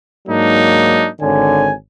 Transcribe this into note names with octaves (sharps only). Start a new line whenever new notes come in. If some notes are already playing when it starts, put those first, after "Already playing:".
G#2 F#3 A#3 D4 D#4
G#1 D3 C#5 G#5